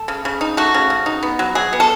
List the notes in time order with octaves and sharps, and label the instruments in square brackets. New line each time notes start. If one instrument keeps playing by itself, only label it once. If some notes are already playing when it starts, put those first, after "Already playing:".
Already playing: [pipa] A4
C#3
C#3
D#4
A3 F#4
C#3
C#3
D#4
B3
F#3
F#3 G#4
B3
A4